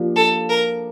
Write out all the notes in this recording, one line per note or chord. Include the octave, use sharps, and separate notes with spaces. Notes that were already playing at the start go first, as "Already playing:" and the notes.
Already playing: F3 A#3 D4 G4
A4
A#4